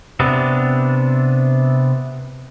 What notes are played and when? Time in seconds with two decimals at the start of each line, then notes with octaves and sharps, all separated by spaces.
0.20 C3 B3 D4